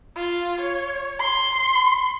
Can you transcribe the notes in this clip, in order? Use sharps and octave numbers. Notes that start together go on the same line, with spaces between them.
F4
C#5
C6